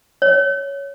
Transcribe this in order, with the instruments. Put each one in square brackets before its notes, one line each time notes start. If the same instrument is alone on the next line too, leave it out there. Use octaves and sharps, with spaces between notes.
[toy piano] C#5